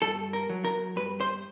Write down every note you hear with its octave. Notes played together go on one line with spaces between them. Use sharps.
G2 A4
A#4
F#3
A#4
G2 B4
C5